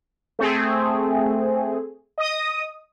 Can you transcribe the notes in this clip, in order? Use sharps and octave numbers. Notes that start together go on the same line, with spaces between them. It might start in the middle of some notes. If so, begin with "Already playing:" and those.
A3 C4 G#4
D#5 D#6